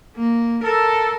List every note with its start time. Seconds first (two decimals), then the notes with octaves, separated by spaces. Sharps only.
0.16 A#3
0.64 A4 A#4